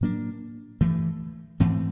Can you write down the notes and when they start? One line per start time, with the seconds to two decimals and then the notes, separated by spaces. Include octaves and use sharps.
0.01 A2 F#3 A#3 D4
0.81 G2 E3 A3
1.60 G#2 E3 A3 C4